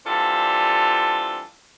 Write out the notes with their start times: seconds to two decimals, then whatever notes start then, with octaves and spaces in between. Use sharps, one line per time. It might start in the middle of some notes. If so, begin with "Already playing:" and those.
0.05 E3 G3 C4 D4 F4 A4